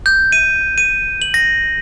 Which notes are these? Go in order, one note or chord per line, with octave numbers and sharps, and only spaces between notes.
G6
D#7
D#7
F#7
A#6